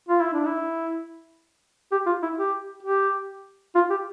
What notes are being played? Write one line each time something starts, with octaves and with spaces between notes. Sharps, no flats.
F4
E4
D4
E4
G4
F4
E4
G4
G4
F4
G4